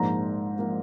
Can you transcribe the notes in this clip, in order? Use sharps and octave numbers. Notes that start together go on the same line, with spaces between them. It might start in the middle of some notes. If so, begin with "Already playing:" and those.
Already playing: A#1 G#2 F3 A#3 A#5
F3 A#3